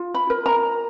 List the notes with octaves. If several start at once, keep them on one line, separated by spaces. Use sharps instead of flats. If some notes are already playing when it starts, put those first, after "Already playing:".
Already playing: F4
B5
A#4
A#5